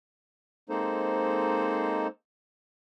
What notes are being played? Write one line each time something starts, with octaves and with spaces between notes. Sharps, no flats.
G#3 A#3 C4 D#4 A4 C5